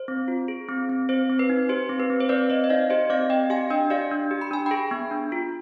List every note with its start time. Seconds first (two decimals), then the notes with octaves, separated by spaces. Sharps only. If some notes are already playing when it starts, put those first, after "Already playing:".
Already playing: C5
0.08 C4
0.28 F4
0.48 G#4
0.69 C4
0.89 C4
1.09 C4 C5
1.30 C4
1.39 B4
1.50 D#4
1.69 G4 C5
1.89 C4
2.00 B4
2.10 C4
2.20 C5
2.29 C4 B4 D5
2.50 C4 C5 D#5
2.64 D#5
2.69 D#4 D5 F5
2.90 G4 C5 D#5
3.10 C4 D5 F5
3.30 C4 D#5 G5
3.50 G4 F5 G#5
3.70 D4 D#5 G5
3.90 G4 D5 F5
4.11 D4
4.31 G4
4.41 B5
4.51 D4 G#5
4.66 G#4 G5 B5
4.91 B3
5.11 D4
5.32 F4